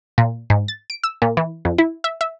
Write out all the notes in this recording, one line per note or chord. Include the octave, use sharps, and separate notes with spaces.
A#2
G#2
A6
D7
E6
A#2
E3
F2
E4
E5
E5